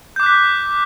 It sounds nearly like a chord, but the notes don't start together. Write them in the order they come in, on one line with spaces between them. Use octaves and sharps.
G6 D6 F#6 B6